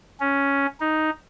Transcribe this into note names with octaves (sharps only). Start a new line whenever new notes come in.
C#4
D#4